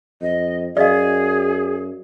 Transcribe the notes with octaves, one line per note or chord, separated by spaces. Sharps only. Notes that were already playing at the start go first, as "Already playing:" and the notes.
F2 D#5
F#2 G#4 D5 D#5 F5